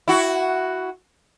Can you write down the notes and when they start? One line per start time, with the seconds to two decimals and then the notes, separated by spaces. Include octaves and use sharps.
0.08 E4 F#4